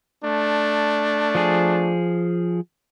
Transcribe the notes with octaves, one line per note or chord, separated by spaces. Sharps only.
A3 D4
F3 G#4